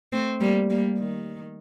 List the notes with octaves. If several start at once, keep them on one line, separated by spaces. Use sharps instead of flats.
A3 C4
G3 A#3
G3 A#3
D#3